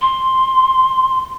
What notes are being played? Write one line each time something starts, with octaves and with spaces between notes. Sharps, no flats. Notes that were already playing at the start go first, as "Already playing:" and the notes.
C6